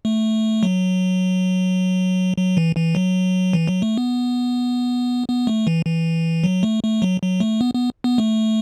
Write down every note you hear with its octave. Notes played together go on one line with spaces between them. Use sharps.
A3
F#3
F#3
E3
E3
F#3
E3
F#3
A3
B3
B3
A3
E3
E3
F#3
A3
A3
F#3
F#3
A3
B3
B3
B3
A3